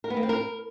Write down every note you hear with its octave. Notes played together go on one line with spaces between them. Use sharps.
A#4
B3
A#3
C4
A#4